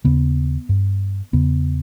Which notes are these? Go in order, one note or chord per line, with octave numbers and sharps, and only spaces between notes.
D#2 C#3 B3
G2
E2 C#3 B3